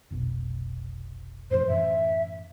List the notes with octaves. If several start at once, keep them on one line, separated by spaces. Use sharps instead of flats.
F1 B1 B2
F#2 A2 F3 C5
F#2 A2 E3 E5